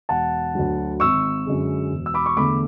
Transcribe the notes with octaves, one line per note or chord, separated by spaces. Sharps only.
E1 F#5 A5
D2 D3 F#3
G#1 C#6 E6
F#2 D3 G#3
E1
E6
B5 D6
C#6
E2 D3 A3 B5 D6